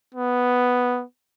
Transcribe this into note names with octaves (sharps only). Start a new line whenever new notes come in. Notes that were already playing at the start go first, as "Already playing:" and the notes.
B3